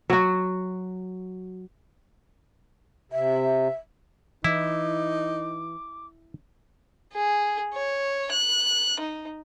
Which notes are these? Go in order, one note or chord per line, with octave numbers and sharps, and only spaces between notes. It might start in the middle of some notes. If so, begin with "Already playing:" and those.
F#3 F#4
C3 E5
E3 D#4 E4 D6
G#4
C#5
F#6
D#4